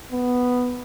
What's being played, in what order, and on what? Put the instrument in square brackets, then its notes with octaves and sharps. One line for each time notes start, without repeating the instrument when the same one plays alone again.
[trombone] B3